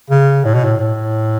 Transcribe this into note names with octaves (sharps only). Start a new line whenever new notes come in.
C#3
A2
B2
A2
A2